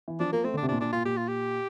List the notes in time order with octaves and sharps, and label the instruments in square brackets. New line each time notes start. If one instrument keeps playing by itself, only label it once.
[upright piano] E3
[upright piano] F3 [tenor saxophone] D4
[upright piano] F3 [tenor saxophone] A#3
[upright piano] A3 [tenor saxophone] C4
[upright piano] D3 [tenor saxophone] D4
[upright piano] C3
[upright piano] A#2 [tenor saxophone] D4
[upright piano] A#2 [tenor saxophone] D4
[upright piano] A#2 [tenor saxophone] F4
[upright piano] A#2 [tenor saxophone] G4
[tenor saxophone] F4
G4